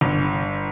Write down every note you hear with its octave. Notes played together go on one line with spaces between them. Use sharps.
G1